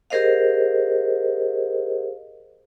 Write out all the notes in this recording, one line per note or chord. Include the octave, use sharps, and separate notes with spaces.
G4 G#4 A#4 C5 D#5 F5